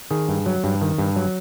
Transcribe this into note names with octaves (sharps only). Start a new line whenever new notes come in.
D#3 G#4
G2
F#3
G2
D#3
G2
F#3